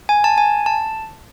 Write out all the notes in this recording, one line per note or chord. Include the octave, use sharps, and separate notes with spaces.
G#5
A5
G#5
A5